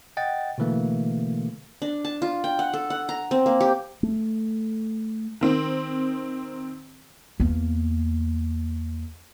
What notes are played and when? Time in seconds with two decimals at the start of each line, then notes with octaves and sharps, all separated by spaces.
0.17 D#5 F#5 G5 A6
0.58 B2 D3 E3 A3 A#3
1.82 D4
2.05 A5
2.22 F4
2.44 G5
2.59 F#5
2.74 A4
2.90 F#5
3.09 A#5
3.31 C4
3.46 A#3
3.60 G4
4.03 A3
5.41 D#3 C4
7.40 E2 A#3